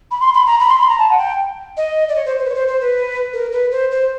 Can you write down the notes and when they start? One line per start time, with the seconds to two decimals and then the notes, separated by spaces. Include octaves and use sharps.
0.11 B5
0.21 C6
0.34 B5
0.47 A#5
0.60 B5
0.69 C6
0.80 B5
0.89 A#5
0.99 A5
1.10 F#5
1.18 G5
1.77 D#5
2.09 D5
2.15 C#5
2.25 C5
2.38 C5
2.45 B4
2.50 C#5
2.55 C5
2.68 C5
2.81 B4
3.33 A#4
3.52 B4
3.71 C5
3.91 C5